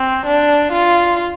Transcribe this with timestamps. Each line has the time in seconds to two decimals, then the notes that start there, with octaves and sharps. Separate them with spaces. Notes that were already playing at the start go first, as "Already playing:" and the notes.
Already playing: C4
0.26 D4
0.72 F4